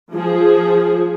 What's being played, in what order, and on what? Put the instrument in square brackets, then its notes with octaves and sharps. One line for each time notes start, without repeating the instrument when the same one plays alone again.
[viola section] F3 G#4